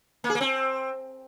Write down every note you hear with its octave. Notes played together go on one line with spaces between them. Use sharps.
A#3
G#4
A#3
C4